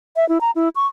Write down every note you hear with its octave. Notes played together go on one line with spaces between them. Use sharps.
E5
E4
A#5
E4
C#6